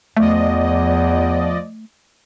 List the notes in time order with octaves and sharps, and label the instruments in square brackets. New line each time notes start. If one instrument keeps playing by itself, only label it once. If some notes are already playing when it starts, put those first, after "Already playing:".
[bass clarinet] E2 [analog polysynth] F3 D5 D#5 [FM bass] A3